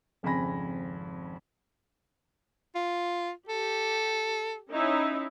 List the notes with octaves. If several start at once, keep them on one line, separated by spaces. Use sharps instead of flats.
G#1 F2 C#3 G#5 B5 A#6
F4
G4 A4
C#4 D#4 E4